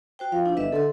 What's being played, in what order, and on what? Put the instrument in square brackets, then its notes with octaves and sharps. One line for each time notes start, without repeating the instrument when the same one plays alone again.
[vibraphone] F#4 C5 G5
[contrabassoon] F3 [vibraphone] F5
[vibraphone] D4 E4
[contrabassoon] G1 [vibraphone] B4 D#5 E5
[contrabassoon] D3 [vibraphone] A4 C6